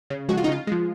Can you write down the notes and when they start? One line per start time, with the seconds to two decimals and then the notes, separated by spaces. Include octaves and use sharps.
0.10 C#3
0.29 F3 G#3 F#4
0.37 F4
0.44 D#4
0.48 C#3 F4
0.67 F3 G#3